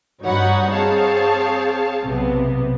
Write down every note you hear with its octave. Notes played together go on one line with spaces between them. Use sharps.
G2 D#4 F#4 C#5 F#5 B5
C4 G#4 C#5 F5 A5
B1 C3 B3